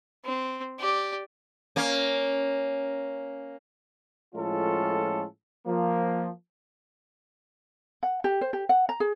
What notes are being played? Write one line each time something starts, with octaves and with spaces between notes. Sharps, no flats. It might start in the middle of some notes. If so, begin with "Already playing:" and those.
C4
G4 D5
A#3 C#4
A2 F3 G#3 C#4 F4 A4
F3 A#3
F#5
G4
C5
G4
F#5
A#5
G#4